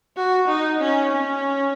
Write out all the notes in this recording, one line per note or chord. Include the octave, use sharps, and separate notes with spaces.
F#4
D#4
C#4
C#4